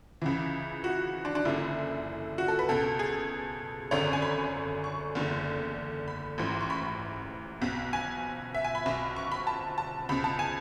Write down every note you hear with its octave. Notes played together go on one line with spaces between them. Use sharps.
C#2 C#3 E3
F#4
D4
D4
F#1 F#2 D3 E4
F#4
A4
B4
C#2 B2 A4
G#4
G#1 F#2 D3 C#5
G#5
B5
C#6
F#1 E2 D3
B5
A1 G#2 E3
C#6
B5
B1 B2
G#5
E5
G#5
B5
B1 B2 B5
C#6
B5
A5
A5
C#2 B2 B5
A5
G#5